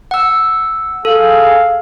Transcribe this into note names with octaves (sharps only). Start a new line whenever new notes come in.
F#5 E6
G#4 A4 F5